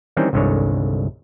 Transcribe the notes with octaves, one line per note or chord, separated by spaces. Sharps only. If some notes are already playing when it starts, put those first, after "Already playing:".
D#3 E3 G3 C4 C#4 D#4
G1 C2 D3 D#3 G#3 C#5